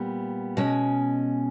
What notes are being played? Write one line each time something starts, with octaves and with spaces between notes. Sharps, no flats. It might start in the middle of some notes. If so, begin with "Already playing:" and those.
Already playing: A#2 G3 B3
B2 G#3 C#4 D#5